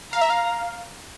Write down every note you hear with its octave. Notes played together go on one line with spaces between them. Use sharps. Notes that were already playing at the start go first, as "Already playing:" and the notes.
F5 A#5
E5
F5